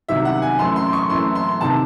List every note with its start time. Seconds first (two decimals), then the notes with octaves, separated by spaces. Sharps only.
0.08 C2 C3 D#3 F#3 E5
0.25 F#5
0.42 G#5
0.59 F#2 E3 A3 C6
0.76 C6
0.93 C#6
1.10 F#2 E3 A3 C6
1.35 C6
1.61 C3 D#3 A5